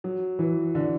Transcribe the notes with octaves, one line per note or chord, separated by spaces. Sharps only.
F#3
E3
D3